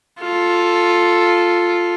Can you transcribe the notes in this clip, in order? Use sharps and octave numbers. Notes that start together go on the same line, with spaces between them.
F4 A4